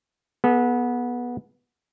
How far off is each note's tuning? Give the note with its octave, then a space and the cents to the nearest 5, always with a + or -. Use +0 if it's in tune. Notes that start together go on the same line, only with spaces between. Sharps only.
B3 -20 G#4 +45